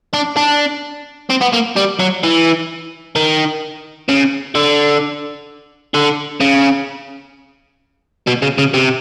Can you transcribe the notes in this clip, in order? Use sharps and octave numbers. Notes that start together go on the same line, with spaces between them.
D4
D4
C4
B3
A#3
G3
F#3
E3
D#3
C#3
D3
D3
C#3
B2
C#3
C#3
C3